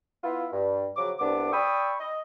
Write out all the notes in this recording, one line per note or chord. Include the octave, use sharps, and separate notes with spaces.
B3 E4 F4
G2
C#3 F3 F#3 D6
C2 B3 D4 D6
D5 G5 B5 C#6 D#6 E6
D#5